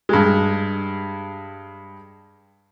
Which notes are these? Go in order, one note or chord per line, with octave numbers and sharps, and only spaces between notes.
G2 G#3